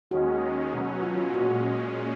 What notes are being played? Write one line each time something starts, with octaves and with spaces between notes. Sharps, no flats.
D#2 D#3 G#3 C#4 F#4
B2 F#3 C#4
F4
F4
A#2 G#3 C#4 F#4